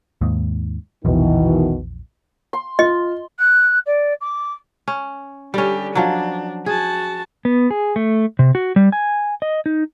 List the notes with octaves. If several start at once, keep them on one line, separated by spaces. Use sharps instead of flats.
D#2 G#2
A#1 E2 B2 D#3 E3
C6
F4 D#5
F#6
D5
D6
C#4
D3 G3 C#4 G4
F3 F#3 D4
F#4 G#4 A5
B3
G#4
A3
C3
F#4
G3
G#5
D#5
D#4